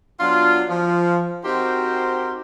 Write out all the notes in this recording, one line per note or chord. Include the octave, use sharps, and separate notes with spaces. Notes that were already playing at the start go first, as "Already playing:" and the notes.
F#3 B3 D4 F4
F3
C4 D#4 F#4 G4 A#4 C5